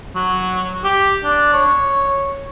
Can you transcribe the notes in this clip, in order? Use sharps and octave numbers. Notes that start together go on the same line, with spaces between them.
F#3
G4
D4
C#5